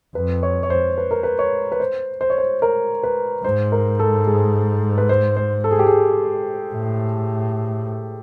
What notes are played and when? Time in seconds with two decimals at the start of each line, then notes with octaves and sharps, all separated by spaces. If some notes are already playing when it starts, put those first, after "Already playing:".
0.15 F2 B4
0.43 C#5
0.63 C#5
0.70 C5
0.98 B4
1.11 A#4
1.23 B4
1.39 C#5
1.72 B4
1.80 C5
2.21 C5
2.30 C#5
2.38 C5
2.62 A#4
3.03 B4
3.44 G#2 C5
3.72 A#4
3.99 A4
4.27 G#4
4.98 B4
5.09 C5
5.37 C5
5.64 A4
5.71 G#4
5.79 G4
5.87 G#4
6.73 A2